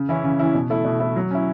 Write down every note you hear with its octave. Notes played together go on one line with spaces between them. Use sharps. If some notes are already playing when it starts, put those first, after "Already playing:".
Already playing: C#3
E3 C#4 E4
C#3
E3 C#4 E4
B2
A3 E4
B2
A3 E4
F#3
C#4 E4